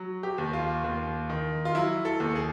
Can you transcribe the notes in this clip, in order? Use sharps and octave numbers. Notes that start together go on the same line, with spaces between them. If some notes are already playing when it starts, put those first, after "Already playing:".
Already playing: F#3
G4
D#2
F4
D#2
D#3
F4
F#3 E4
A4
D#2
G#4